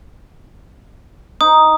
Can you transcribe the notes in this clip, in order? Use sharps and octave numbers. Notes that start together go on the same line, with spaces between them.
D#4 D#6